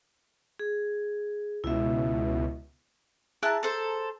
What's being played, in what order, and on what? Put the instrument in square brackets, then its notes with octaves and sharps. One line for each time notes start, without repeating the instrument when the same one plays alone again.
[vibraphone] G#4
[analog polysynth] C#2 B2 [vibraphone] E4 E5
[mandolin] E4 F#6 [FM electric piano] G#4 A5 A#5
[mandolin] A4 C5